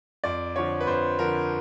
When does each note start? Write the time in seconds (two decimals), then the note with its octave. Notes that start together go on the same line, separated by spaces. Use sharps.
0.24 F2 D5
0.56 D3 F3 C#5
0.81 B4
0.87 F2 C5
1.19 D3 F3 A#4